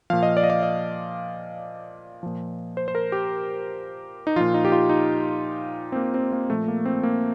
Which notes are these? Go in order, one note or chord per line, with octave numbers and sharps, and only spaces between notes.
A#2 F3 F5
D#5
D5
D#5
D5
D#5
A#2 F3
C5
C5
A#4
G4
D#4
A#2 F3 F4
D#4
G4
F4
D#4
C4
A#3
C4
A#3
A#2 F3 A3
A#3
C4
A#3